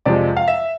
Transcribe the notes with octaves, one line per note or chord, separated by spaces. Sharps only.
F2 C3 F3 G#3 D5
F5
E5